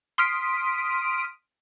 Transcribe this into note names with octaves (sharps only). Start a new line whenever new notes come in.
C6 D#6 F6 B6 D7